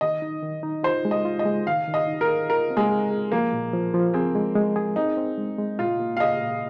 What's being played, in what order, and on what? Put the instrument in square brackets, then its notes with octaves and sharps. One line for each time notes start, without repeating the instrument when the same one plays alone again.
[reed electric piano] D#3 [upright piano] D#5
[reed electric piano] D#4
D#3
D#4
[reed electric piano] F4 [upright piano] C5
[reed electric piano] G#3
[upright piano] D#5
[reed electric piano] F4
[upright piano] D#5
[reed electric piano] G#3
[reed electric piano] D#3 [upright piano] F5
[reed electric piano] D#3
[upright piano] D#5
[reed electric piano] D#4
[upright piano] A#4
[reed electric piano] G#4
[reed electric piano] F4 [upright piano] A#4
[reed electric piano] C4
[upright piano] G#3
[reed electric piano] G#4
G#4
[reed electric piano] F3 [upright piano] A#3
[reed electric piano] A#2
F3
F3
[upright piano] C4 [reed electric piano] G#4
[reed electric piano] G#3
G#3
G#4
[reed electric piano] C4 [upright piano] D#4
[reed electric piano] C4
G#3
G#3
[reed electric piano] A#2 [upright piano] F4
[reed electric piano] A#3
[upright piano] F5
[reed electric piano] G#4 [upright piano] D#5
[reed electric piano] A#2